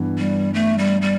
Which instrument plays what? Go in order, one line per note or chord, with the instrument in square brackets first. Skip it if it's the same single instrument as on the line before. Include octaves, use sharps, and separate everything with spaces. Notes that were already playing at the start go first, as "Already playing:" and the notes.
Already playing: [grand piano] G2 E3 B3
[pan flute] G3
A3
G3
G3